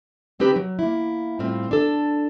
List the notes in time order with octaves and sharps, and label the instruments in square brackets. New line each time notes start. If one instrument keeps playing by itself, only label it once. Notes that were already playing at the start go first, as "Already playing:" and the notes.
[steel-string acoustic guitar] D3 C4 D#4 G4 B4 A5
F#3
A#3 E4
A2 G3 C4 F4
D4 A4